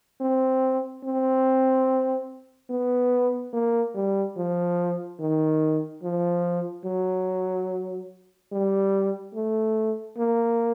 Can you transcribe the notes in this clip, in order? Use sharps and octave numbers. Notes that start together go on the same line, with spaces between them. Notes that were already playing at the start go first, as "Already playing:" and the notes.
C4
C4
B3
A#3
G3
F3
D#3
F3
F#3
G3
A3
A#3